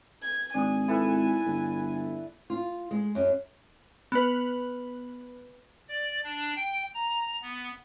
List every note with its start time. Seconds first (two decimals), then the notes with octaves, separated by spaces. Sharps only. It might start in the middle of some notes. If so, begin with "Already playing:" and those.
0.23 G#6
0.54 G#1 D4 G#5 D#6
0.88 E4 A4 B4
1.46 G1
2.50 F4
2.91 G#3
3.15 F#2
4.12 B3 B4
5.89 D5
6.24 D4
6.56 G5
6.94 A#5
7.42 B3